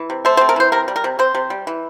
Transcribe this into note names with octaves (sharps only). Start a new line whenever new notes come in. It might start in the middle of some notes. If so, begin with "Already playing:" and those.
Already playing: E3
C3
A3 C5
C5
C4
A#4
E3 C5
C3 A#4
G3
A#4
C3
C4 C5
C3
G3
E3